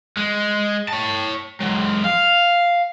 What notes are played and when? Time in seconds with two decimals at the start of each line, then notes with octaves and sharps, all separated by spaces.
0.17 G#3
0.88 C#5 A5
1.60 F#3 G#3
2.04 F5